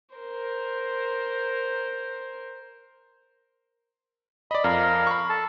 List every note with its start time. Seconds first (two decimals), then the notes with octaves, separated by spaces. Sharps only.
0.16 A#4 C5
4.51 D5 D#5 B5
4.64 F2 A#4 F5
5.07 B5 C#6
5.29 A4 A5